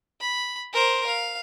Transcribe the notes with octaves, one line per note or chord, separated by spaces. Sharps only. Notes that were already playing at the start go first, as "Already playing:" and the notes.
B5
A#4 C5
F5